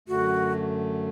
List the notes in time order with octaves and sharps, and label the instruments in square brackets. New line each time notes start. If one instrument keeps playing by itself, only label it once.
[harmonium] F#2 D3 A3 [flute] F#4